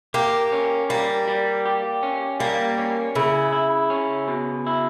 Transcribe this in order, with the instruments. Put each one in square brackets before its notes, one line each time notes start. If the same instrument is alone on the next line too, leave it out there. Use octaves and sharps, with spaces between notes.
[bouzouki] A#3 [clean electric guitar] G4
[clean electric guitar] C#4
[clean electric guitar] G3 [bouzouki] A#3
[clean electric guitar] G3
G4
C#4
[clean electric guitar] G3 [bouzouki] A#3
[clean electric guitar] C#4
[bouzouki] C#3 [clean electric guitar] E4
[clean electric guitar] E4
C#4
B2
E4